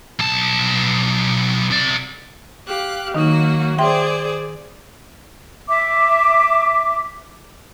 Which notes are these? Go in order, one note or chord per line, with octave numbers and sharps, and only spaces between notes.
B1 A5
C3 D5
G4 F5 F#6
D#3 F#3 A#3 D#4 F#4
G#4 C5 D5 E5 G5 C6
E5 D6